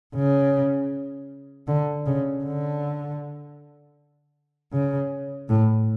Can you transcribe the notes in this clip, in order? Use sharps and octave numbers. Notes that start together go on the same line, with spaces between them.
C#3
D3
C#3
D3
C#3
A2